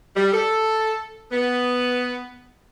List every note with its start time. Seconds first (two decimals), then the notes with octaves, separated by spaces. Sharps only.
0.15 G3
0.32 A4
1.31 B3